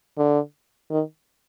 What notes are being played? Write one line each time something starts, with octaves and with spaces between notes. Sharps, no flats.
D3
D#3